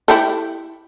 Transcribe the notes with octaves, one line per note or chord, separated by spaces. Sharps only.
E4 G4 A4